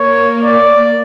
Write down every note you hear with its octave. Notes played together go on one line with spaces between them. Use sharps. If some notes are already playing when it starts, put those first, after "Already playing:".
Already playing: A#3 C#5
D5